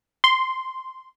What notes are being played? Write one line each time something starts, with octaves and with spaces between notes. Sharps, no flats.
C6